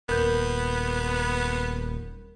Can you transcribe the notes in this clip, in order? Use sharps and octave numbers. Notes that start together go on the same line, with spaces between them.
D#1 B3 A#4 G6